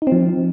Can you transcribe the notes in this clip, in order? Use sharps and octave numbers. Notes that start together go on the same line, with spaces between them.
D#4
C4
F3